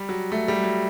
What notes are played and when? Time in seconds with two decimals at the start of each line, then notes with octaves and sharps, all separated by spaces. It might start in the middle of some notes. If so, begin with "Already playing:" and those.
Already playing: G3
0.09 F#3
0.32 A3
0.48 G3
0.64 F#3